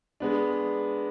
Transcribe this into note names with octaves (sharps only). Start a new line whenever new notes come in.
G#3 B3 D4